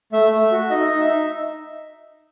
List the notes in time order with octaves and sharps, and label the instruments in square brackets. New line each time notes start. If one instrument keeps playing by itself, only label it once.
[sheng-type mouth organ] A3 E5
A3
F#4
D#4 D#5
D#4
E5
D#4